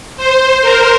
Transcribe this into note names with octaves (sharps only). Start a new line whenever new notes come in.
C5
A#4